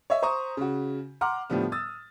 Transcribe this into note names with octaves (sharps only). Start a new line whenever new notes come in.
C#5 D#5 E5
C5 A#5 C#6 D#6
C#3 F#4
F#5 A#5 C6 D6 F6
A2 D3 F3 G3 B3
D#6 E6 A6